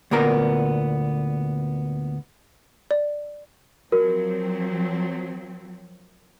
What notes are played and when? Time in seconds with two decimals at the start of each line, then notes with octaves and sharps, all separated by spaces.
0.11 D2 A#2 B3 A#4 A#5
2.91 D5
3.92 F3 F#3 C4 F#4 A#4